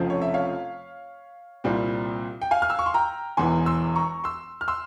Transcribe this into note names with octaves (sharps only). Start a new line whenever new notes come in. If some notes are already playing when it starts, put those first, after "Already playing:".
Already playing: F1 F2 C#3 F3 C4
C#5
E5
C#5 F5
C2 A#2 G3 C4
G5
F5 G#5
F6
E6
C#6
C6
G5 A#5
E1 E2 E3 G#5 C6
C6 E6
A#5 C#6
C6 E6
F6
C6 E6